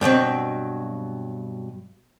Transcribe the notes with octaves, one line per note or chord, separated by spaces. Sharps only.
G2 B2 F#3 C4